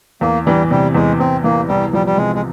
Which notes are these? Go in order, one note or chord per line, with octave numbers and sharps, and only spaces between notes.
E2 A#3
E3 G3
C3 G3
E2 G#3
E2 C4
E3 A#3
C2 G3
F3 G3
G3
C3 G#3
G#3